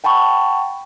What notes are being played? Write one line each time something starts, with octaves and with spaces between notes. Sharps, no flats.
F#5 G5 A5 B5 C#6